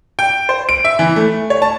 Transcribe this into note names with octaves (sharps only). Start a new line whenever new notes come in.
G5
C5
D7
E5
E3
A3
C#5
A5